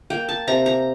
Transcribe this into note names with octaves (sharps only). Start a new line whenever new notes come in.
A#3 G5
A5
C3 A#5
A#5